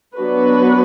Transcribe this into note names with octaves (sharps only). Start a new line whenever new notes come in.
F#3 B3 D4 F#4 B4